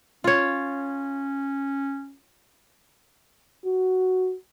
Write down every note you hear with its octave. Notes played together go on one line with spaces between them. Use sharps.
C#4 F4 C#5
F#4